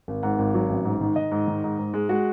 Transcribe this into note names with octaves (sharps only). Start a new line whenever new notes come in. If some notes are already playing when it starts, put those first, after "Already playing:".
G#1
G#2 F#5
G#1
F#3
A1
G#2
D#3
D#3 D#5
G#2
D#3
G#2
G#2
G#3
G#3 F#4